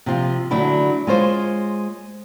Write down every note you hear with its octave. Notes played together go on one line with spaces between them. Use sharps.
C3 F3 F4
D3 F#3 A3 D4 E4
G#3 F4 C5 C#5